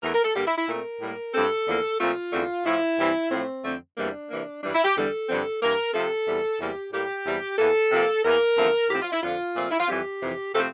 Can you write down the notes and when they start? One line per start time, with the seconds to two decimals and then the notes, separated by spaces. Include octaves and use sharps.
0.02 E2 E3 A3 A#4
0.14 A#4
0.25 A4
0.36 G2 D3 G3 A#3 G4
0.47 E4
0.58 E4
0.69 A#2 A3 C4 A#4
1.01 A2 G3 A#3
1.34 G2 F3 A3 C4 A4
1.68 E2 D3 F3 A#3
2.00 A#2 F3 A3 C4 F4
2.33 E2 D3 A3 C4
2.66 A2 F3 A3 E4
2.99 G2 E3 G3 C4
3.31 A2 F3 A3 C4
3.64 F2 D3 A3 C4
3.97 E2 C3 E3 G3 A#3 D4
4.30 C3 E3 A#3
4.62 G2 E3 G3 D4
4.74 E4
4.85 G4
4.96 E2 D3 G3 A4
5.29 G2 D3 F3 C4
5.62 G2 E3 A#3 A#4
5.94 C3 F3 A3 C4 A4
6.27 E2 C3 G3
6.60 E2 C3 G3 A#3 G4
6.93 A2 G3 A#3 G4
7.26 E2 C3 G3
7.58 E2 E3 A#3 A4
7.92 C3 F3 A#3
8.25 E2 E3 A#3 A#4
8.57 E2 D3 F3 A3 C4
8.90 A2 F3 C4 G4
9.02 F4
9.12 E4
9.23 F2 D3 F3 F4
9.56 A#2 F3 A3 C4
9.71 E4
9.80 F4
9.88 F2 E3 G3 C4 G4
10.22 F2 C3 E3
10.55 C3 F3 A3 C4 A4